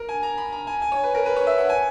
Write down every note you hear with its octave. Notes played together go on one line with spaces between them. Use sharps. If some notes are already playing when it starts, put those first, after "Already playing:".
Already playing: A#4
G#5
A#5
B5
A#5
G#5
G#5
C#5
B4
A#4
B4
C#5
E5
F#5
G#5